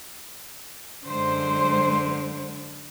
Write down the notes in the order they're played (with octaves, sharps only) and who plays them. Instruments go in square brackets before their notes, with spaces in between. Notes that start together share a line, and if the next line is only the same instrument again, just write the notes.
[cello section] F#2 G#3 C5 [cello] D3 [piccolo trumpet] C6